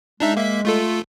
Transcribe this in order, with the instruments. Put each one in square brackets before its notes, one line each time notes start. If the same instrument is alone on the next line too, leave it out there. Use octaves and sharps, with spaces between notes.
[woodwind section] G#3 [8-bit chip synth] D4 D#4 E5
[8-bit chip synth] A#3 E5 B6
A3 F4 A4